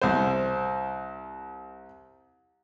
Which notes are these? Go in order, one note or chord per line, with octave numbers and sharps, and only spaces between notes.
C2 C5